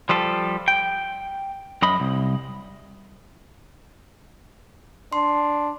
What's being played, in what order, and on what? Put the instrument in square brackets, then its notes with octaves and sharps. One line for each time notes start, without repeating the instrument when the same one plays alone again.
[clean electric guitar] F3 G3 F4 A4
G5
F#2 D#5 B5
C2
[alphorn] D4 [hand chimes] C6